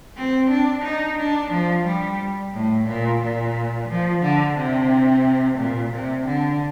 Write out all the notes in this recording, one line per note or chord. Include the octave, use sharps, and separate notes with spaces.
C4
D4
D#4
D4
F3
G3
A2
A#2
A#2
F3
D3
C3
A#2
C3
D3